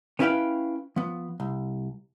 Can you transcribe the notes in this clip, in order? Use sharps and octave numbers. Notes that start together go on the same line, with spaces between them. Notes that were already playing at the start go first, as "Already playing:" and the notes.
B3 C#4 E4 B4 F5 G5
F3 B3
C2